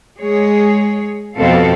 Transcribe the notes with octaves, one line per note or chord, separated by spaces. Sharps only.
G#3 G#4 C#5
F2 B2 F3 C4 A4 F5